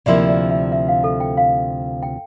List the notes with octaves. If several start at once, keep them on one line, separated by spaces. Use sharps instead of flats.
D2 C3 F3 A#3 E4 D5
D5
E5
E5
F5
A4
G5
F5
G5